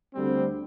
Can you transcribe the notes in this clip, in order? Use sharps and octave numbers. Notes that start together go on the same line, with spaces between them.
D2 D3 G3 C4